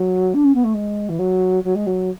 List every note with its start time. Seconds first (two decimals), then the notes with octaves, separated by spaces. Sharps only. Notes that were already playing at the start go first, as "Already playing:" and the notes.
Already playing: F#3
0.34 D4
0.44 C#4
0.54 B3
0.64 A3
0.74 G#3
1.09 E3
1.19 F#3
1.64 F#3
1.75 G#3
1.86 F#3